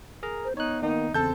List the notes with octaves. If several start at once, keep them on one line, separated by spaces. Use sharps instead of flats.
G#4 A#4 A#5
C5
B3 D#4 C#5 F#6
D#3 A#3 D#4
E2 C#3 C4 A4 A5 G6